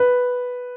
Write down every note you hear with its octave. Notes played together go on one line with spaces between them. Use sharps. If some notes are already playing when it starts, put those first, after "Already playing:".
Already playing: B4